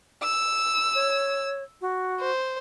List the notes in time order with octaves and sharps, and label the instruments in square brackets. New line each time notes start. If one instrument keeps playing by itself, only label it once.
[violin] E6
[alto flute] C#5
F#4
[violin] C5